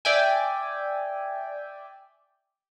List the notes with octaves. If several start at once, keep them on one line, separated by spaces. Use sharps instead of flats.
D5 E5 G5 G#5